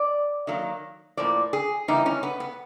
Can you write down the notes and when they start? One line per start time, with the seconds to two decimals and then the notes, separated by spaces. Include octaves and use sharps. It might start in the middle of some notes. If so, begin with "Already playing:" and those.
Already playing: D5
0.47 D#3 F#3 A#3
1.17 A2 F3 A#3 D5
1.53 G#4
1.88 C#3 E3 G3 A#3 D#4
2.06 C#4
2.23 B3
2.40 B3